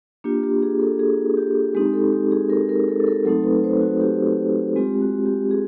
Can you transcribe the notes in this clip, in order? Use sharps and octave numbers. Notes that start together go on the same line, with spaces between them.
A#3 D4 F4 G4
G4
G#4
A4
G#4
G4
G#3 C4 D#4 G4
A4
G4
G#4
A#4
A#4
A4
A4
A#4
F#3 A3 C4 D#4 A4
B4
C5
F#4
G4
G#3 C4 F4 G4
F#4
G4
G#4